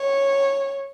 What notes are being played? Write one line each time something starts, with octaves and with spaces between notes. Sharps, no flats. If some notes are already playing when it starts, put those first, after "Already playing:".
Already playing: C#5